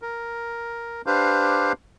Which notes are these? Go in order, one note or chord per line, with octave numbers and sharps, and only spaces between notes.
A#4
D4 G4 B4 C5 F5